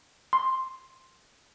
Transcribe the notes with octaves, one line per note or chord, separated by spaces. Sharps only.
C6